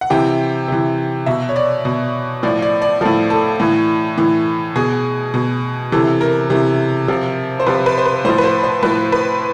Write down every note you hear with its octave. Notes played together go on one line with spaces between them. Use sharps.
F#5
C3 E3 G5
C3 E3
B2 E5
C#5
D5
B2
A2 F3 D5
D5
D5
A2 F3 A4
A4
A2 E3
A2 E3
B2 G#4
B2
C3 E3 A4
A#4
C3 E3
C3 F3
C5
C3 F3 B4
B4
C5
B4
A2 F3 C5
B4
C5
C5
A2 F3 B4
B4